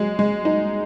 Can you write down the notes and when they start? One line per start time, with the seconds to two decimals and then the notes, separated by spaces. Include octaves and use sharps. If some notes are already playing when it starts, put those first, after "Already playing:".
Already playing: F#3 G#3
0.19 G#3
0.45 D#4